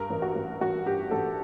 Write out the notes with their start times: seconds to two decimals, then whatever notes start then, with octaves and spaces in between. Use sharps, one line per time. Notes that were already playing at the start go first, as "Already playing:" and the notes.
Already playing: G2 A#4
0.10 A1
0.22 F#4
0.35 A1
0.60 A1 F#4
0.86 G2 G4
1.11 A1 A4